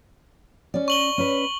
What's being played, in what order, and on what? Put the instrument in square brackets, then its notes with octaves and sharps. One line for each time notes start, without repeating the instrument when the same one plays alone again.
[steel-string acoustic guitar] C#4 D5
[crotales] C#6 F#7 G7
[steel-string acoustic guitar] C#4 B4